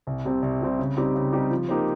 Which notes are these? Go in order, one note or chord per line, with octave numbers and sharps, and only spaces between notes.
C2
C3 G3 C4
C2
C3 G3 C4
C#3
G3 C4 D#4 G4
C#3
G3 C4 D#4 G4
F3
A#3 D#4 G4 C5